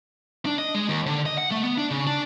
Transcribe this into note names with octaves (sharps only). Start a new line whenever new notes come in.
D4
D#5
G#3
D#2
D3
D#5
F#5
A3
B3
D4
C#3
D4